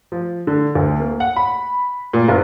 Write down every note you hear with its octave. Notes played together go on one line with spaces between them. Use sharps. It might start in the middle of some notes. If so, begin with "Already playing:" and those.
F3
D3
D2
A#3
F#5
B5
A#2
F#1